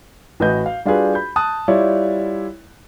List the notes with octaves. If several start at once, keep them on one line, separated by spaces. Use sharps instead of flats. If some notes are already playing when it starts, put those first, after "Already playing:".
A1 F#4 B4 D#5 B5 G6
F5
G3 D4 F4 F#4 G#4 B4
B5 G6
A5 D#6 F#6
G3 E4 F4 C#5 D5